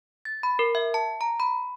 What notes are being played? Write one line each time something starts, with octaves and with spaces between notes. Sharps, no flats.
A6
B5
A#4
E5
A5
A#5
B5